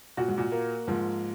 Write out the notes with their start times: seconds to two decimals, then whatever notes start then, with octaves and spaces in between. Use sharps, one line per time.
0.17 A#2 F#4
0.28 G#2
0.38 A#2
0.52 A#3
0.88 G#2 F3